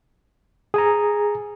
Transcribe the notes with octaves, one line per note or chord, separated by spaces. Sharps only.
G#4 G#5 A#5